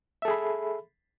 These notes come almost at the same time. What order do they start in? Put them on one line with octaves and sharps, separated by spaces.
E5 A4 G#4 B5